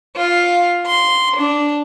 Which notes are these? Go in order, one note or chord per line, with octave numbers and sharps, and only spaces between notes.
F4
C6
D4